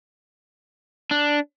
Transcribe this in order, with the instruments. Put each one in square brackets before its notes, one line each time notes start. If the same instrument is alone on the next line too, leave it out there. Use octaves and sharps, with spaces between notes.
[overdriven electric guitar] D4